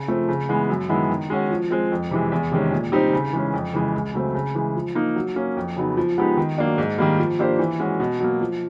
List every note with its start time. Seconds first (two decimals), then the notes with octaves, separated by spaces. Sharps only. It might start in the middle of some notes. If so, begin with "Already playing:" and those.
Already playing: C#3
0.08 F3 A3 C4
0.29 C#3
0.49 E3 G#3 B3
0.69 F#2
0.89 D#3 G#3 B3 E4
1.09 D#3
1.30 G#3 C#4 F#4
1.51 F3
1.71 G#3 C4
1.91 F2
2.11 C3 E3 G#3
2.32 E2
2.52 C3 D#3 G#3 C#4
2.72 A#2
2.92 G3 C4 D#4 G4
3.13 C#3
3.33 E3 G#3 C#4
3.53 F2
3.74 C#3 E3 G#3
3.94 C#2
4.14 C#3 F#3 A3 C4
4.34 C#3
4.55 E3 G#3
4.75 F3
4.95 A#3 D#4
5.16 F#3
5.36 A#3 C#4
5.56 F2
5.77 C#3 F#3 B3 D#4
5.97 F3
6.18 G#3 B3 D#4 G4
6.37 D#3
6.58 F#3 A#3 D4
6.78 G#2
6.98 D#3 G3 A#3
7.19 F3
7.39 A#3 D4 G4 C5
7.59 E3
7.80 G#3 C#4 F#4
8.00 B2
8.20 F#3 A#3
8.41 F3